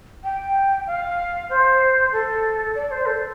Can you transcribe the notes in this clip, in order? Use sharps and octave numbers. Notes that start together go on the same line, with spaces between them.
G5
F5
C5
A4
D5
C5
A4